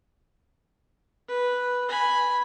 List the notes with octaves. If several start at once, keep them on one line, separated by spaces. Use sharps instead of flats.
B4
G#5 B5